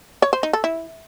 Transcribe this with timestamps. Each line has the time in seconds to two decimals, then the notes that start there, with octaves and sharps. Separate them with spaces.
0.22 C#5
0.33 C5
0.43 D#4
0.53 A4
0.64 E4